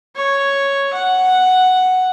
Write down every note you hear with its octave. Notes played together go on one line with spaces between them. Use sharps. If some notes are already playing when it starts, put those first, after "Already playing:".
C#5
F#5